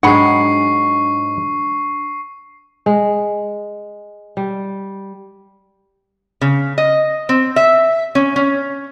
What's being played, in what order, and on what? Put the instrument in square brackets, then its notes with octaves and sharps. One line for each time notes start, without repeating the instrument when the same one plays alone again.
[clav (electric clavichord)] G#2 F#3 G#3 [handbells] D4 [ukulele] F#5 B5 [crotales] C#6 C7
[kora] G#3
G3
[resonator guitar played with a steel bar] C#3
D#5
C4
E5
C#4
C#4